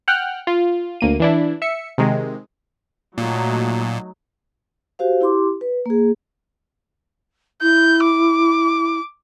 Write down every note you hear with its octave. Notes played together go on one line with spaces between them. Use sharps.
F#5 G5 F6 F#6
F4
D2 A#3 D#7
E3 D4 E4
E5 C#7
C3 D#3 G#3
A#2 F#3 A3 D#4
F#4 G4 C5 F5
E4 G4 C6 D6
B4
A#3 G#4
E4 G6
D6